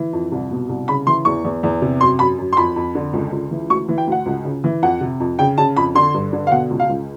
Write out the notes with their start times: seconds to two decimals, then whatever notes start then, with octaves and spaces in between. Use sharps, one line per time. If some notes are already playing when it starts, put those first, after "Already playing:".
Already playing: E3
0.13 F2
0.32 C2
0.51 B2
0.69 C2
0.88 C#3 B5
1.07 E3 C6
1.25 E2 C#6
1.44 E2
1.63 E2
1.82 C3
2.00 F#2 C6
2.19 F#2 B5
2.38 F#2
2.53 C6
2.57 F2 B5
2.76 F2
2.95 D3
3.13 C#2
3.32 C#2
3.51 E3
3.70 D2 C#6
3.88 E3
3.98 G5
4.07 D2 F#5
4.26 C#2
4.45 C#3
4.64 E3
4.82 F2 F#5
5.01 C3
5.20 F2
5.39 C#3 G5
5.58 C#3 A5
5.77 F2 B5
5.95 D3 C6
6.14 G2
6.33 D3
6.47 F5
6.51 B2 F#5
6.70 C#2
6.80 F5
6.89 C#2